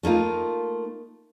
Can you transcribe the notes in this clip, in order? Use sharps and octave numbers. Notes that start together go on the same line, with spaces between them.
A3 A#3 D#4 F4